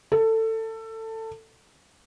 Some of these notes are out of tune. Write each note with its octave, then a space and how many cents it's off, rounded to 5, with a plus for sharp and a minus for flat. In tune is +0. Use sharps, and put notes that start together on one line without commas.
A4 +20